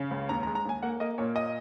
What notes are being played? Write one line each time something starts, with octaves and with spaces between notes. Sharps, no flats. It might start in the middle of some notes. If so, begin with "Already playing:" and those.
Already playing: C#3
C#2
D#2 A#5
A#5
G#3
A#5
D#2 G#5
A#3 F#5
A#3 D#5
A#2 C#5
D#5